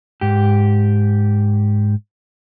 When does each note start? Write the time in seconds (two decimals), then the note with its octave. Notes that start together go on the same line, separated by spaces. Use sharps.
0.21 G#2 G4